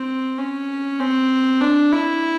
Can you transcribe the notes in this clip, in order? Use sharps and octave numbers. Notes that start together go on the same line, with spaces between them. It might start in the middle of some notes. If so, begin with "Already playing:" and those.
Already playing: C4
C#4
C4
D4
E4